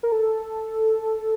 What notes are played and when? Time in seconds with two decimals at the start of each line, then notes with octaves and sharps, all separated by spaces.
0.03 A#4
0.12 A4